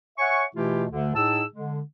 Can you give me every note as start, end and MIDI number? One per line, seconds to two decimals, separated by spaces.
0.18 0.44 73
0.18 0.44 76
0.18 0.44 78
0.18 0.44 80
0.18 0.44 85
0.55 0.84 47
0.55 0.84 52
0.55 0.84 57
0.55 0.84 64
0.55 0.84 65
0.55 0.84 67
0.89 1.10 38
0.89 1.10 50
1.14 1.42 45
1.14 1.42 63
1.14 1.42 68
1.14 1.42 81
1.14 1.42 88
1.52 1.80 50
1.52 1.80 56